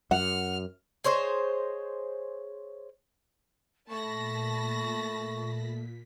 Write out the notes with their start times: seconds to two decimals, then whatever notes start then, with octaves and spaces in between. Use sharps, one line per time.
0.11 F#2 F#5 F6
1.04 G#4 C5 C#5 D#5
3.90 A#2 A3 A5 B5 C#6 A#6 B6